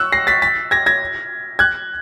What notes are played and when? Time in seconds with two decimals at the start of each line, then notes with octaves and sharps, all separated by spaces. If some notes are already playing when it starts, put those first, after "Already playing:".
Already playing: C#6 E6 F#6
0.12 A#6 C7
0.27 A6 B6
0.42 A6 B6
0.71 G#6 A#6
0.86 G#6 A#6
1.59 F#6 G#6